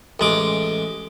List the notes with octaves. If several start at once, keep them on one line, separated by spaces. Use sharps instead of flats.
A1 G#3 D6